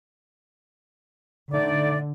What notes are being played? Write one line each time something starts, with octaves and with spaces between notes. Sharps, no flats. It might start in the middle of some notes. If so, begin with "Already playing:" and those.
D3 A3 D#4 D5